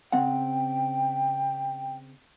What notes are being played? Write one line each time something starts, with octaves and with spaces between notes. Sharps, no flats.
C#3 C4 F#5 G5